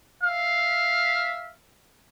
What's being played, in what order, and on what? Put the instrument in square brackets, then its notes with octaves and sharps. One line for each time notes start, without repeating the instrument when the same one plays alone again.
[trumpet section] E5 F5